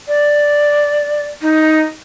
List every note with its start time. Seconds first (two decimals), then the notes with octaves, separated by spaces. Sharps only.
0.08 D5
1.42 D#4